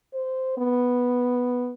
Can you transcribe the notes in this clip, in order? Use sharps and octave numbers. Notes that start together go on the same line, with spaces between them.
C5
B3